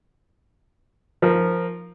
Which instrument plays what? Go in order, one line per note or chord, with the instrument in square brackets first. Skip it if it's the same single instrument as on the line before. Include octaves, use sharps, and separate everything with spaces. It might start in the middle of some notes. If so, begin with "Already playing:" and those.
[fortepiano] F3 A#4